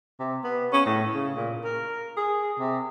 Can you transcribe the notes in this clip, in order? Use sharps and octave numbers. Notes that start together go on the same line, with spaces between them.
C3
B3
C#4
A2
C#3
A#2
A#4
G#4
C3